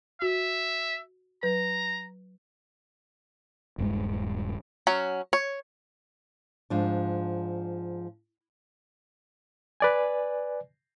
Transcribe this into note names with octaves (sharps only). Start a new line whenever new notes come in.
F#4 E5
F#3 B4 A#5
D#1 G2 G#3
F#3 C#4
C#5
G#2 F3 D4
B4 D5 G#5